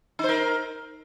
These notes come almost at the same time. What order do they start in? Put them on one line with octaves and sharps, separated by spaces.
D#4 C5 A#4